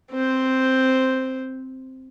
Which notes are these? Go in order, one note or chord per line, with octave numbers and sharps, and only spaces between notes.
C4 C5